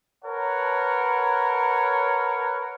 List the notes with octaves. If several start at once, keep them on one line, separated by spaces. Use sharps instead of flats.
A#4 B4 C#5 F#5 A5